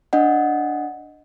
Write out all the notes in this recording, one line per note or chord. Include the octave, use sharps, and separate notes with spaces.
D4 D#5 F#5